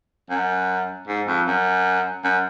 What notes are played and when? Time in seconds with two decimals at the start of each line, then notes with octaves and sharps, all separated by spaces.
0.30 F#2
1.08 G#2
1.28 F2
1.47 F#2
2.24 F#2